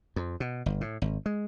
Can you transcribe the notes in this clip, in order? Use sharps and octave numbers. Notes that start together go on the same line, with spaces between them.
F2
B2
G1
A2
G#1
G#3